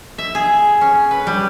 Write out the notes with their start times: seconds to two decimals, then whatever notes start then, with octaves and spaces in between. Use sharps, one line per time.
0.18 E5
0.35 G#4
0.81 C#4
1.11 B4
1.27 G3